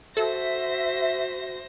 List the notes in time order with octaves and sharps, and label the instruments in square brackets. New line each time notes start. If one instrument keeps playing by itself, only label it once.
[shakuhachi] F#4 [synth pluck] A4 [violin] C5 A#6 [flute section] E5